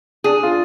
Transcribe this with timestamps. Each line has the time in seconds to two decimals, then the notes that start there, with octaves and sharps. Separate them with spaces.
0.24 D4 G#4
0.43 F4